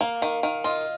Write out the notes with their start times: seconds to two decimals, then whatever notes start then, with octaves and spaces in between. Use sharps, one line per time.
0.01 A#3 F5
0.22 D#3 F5
0.43 D#3 F5
0.64 F4 D#5